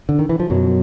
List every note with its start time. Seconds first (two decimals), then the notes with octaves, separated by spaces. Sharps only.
0.09 D3
0.19 D#3
0.29 E3
0.40 F3
0.50 F#2 B2 F#3